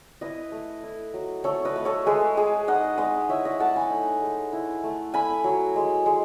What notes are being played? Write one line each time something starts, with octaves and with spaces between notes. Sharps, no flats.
E4 B4 D#5
A3
E4
F#3
A3 A4 C#5
B4 D#5
A3
A4 C#5
G#3 G#4 B4
G#3 G#4
D#4 D#5 F#5
G#3 B4 D#5
E4 C#5 E5
D#5 F#5
A3 F#5 A5
G#5 B5
D#4
G#3
E4
A3
E4 G#5 B5
F#3
G#3
G#3